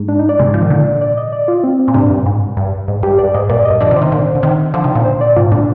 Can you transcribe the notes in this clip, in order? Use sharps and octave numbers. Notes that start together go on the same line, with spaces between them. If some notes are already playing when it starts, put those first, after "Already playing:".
Already playing: G#2
D4
D#4
D5
G#2 C3
F3
D#3
A#2 D3
D5
D#5
D5
F4
C4
C4
A#2
G#2 C3 D4
G2
G#2
G2
G#2
G2 G4
G2 D5
G#2 D#5
G2 A#2 D5
D#5
G2
D3 F3 D5
C3 D#3
C5
C3 D#3
A#2 D3
D3
C3 D#3
D3 F3 C5
C3 D#3
A#2 D3
C5
D5
G#2 C3 F4
A#2 D3 D4